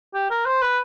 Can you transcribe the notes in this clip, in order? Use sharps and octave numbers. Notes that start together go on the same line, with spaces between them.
G4
A#4
C5
B4